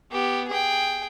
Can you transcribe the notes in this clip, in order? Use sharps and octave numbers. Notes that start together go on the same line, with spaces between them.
B3 G4
G#4 G5